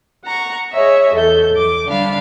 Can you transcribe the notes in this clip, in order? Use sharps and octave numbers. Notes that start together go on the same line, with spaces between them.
F#5 A#5 C#6
G#4 C#5 D#5 E5
E2 A4 G6
E2 D6
D3 G3 D4 F5 B5